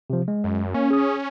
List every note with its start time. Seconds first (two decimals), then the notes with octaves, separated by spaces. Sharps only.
0.10 C3 F3
0.28 G#3
0.44 F#2
0.74 A#3 C#4
0.90 G#4 D#6